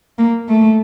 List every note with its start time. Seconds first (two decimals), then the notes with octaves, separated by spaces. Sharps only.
0.18 A#3
0.48 A3